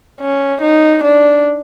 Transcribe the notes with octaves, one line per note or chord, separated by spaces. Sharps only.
C#4
D#4
D4